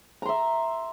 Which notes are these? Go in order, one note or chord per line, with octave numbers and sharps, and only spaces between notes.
E5 A#5 C6